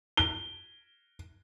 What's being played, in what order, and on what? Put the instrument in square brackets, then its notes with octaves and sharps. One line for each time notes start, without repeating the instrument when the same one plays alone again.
[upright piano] G7